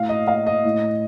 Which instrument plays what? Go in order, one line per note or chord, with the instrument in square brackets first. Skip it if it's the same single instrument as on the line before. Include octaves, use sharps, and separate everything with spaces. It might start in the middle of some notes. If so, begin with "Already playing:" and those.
Already playing: [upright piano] A2 F5
D#5
F5
D#5
A2